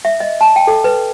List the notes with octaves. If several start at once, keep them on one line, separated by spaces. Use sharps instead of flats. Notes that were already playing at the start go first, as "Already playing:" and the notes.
E5
D#5
A5
G5
A4
B4